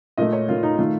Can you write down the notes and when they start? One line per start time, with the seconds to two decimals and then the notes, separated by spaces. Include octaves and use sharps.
0.18 A#2 A3 D#5
0.33 C#5
0.49 A#2 A3 F4
0.63 D#4
0.78 D#3 A3 F4